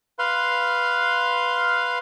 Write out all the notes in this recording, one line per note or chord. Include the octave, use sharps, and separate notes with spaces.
B4 F5 C6